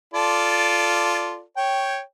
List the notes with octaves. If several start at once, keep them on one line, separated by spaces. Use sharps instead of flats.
F4 A4 D5
C#5 G5